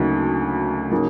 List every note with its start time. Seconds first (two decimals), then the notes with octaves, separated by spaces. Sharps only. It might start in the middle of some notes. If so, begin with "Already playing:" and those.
Already playing: D2 C#3 F#3 A#3 D#4
0.91 C#3 F#3 A#3 D#4